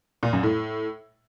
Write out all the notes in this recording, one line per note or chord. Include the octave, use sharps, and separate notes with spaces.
A#2
F#2
A2